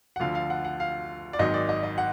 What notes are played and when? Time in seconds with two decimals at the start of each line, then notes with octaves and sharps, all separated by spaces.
0.16 F#5
0.20 D2 D3 F3 F5
0.35 F5
0.50 F#5
0.65 F#5
0.80 F5
1.33 D5
1.39 G#1 G#2 D#3 F#3 D#5
1.54 D5
1.69 D#5
1.83 D#5
1.98 F#5